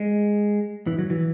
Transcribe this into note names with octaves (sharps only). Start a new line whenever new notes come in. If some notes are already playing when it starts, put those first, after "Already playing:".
Already playing: G#3
E3
F#3
E3